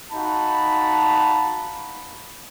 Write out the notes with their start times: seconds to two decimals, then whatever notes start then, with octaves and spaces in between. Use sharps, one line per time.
0.13 D#4 F#4 F5 A5 B5